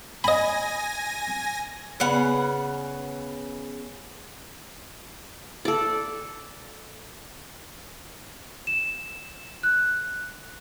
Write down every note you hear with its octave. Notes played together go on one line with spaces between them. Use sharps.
D#5 G#5 B5 A#6
C#3 B3 F#5
A4 D5
E7
F#6